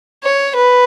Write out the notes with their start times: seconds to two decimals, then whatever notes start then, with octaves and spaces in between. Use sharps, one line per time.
0.24 C#5
0.55 B4